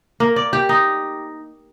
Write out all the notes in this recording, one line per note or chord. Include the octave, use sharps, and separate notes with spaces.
A#3
D5
G4
D#4